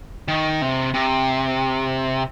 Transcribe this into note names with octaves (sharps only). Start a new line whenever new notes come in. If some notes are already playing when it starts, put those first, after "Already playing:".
D#3
C3
C3